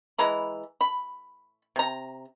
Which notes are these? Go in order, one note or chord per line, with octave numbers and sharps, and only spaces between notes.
E3 G#3 A#5 B5
B5
C3 A#5